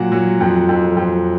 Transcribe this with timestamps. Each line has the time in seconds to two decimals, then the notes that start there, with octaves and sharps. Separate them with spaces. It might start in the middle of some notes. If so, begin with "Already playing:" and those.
Already playing: A#2 F#3 F#5
0.12 F#3
0.40 F2
0.69 F2
0.97 F2